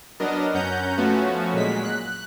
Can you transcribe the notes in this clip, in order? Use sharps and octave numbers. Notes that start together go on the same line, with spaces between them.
F#3 B3 D4 A#4 D#5
F#2 C#4 F#5 A#5 G6
F3 A3 B3 C#4 F#4
A#2 F#3 G#3 B6
F#6